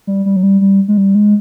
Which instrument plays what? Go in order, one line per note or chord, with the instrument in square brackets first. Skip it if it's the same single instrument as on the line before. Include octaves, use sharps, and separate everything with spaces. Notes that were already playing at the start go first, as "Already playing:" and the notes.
[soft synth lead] G3
G3
F#3
G3
G3
G#3
G3
G#3